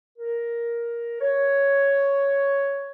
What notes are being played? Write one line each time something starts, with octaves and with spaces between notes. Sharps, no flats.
A#4
C#5